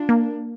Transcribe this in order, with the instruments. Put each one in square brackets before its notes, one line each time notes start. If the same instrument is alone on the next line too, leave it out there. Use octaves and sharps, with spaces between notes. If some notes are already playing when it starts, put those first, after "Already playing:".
Already playing: [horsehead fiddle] D4 [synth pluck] F4
[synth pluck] A#3